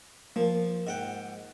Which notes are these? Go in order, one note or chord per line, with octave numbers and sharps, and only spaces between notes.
F3 A#3
G#2 F#5 G5